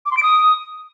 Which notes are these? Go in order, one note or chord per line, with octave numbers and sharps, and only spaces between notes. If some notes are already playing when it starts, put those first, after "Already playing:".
D6
C6
D7
D#6